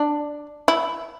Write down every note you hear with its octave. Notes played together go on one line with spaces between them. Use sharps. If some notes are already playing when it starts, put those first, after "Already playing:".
Already playing: D4
E4